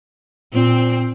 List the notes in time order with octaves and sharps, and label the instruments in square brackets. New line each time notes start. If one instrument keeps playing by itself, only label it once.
[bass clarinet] A#2 [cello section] C4